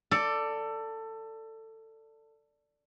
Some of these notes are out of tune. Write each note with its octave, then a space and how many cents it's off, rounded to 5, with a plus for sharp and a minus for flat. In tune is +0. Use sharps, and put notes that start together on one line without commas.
A4 +20 D5 +0